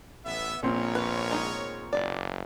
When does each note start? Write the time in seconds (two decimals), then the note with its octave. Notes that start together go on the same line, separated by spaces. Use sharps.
0.25 A1 B3 E5
0.63 A#1 A#2 B3 C4 A#4 C#5
0.95 B4
1.31 G#3 D#4
1.93 F#1 D5